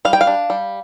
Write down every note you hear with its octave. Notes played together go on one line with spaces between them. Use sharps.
G3 F5
G5
F5
D4
G3